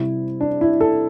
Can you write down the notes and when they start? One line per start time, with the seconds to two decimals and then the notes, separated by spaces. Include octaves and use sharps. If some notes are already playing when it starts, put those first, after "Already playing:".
Already playing: C3 G3 E4
0.41 D4
0.61 E4
0.81 A4